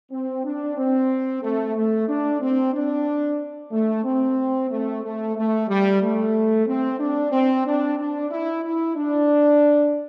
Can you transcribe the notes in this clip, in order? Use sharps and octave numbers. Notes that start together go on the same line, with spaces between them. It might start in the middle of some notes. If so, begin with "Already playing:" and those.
C4
D4
C4
A3
A3
D4
C4
D4
A3
C4
A3
A3
A3
G3
A3
C4
D4
C4
D4
D4
E4
E4
D4